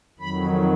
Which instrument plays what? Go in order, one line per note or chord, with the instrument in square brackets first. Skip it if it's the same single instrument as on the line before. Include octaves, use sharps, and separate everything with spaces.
[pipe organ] F2 D#3 F#3 B5